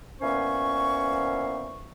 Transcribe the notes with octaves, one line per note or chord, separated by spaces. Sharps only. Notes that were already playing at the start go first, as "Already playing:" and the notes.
A#2 E3 B3 C#4 C5 C#6